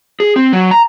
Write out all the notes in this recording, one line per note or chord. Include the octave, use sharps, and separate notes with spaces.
G#4
C4
F#3
A#5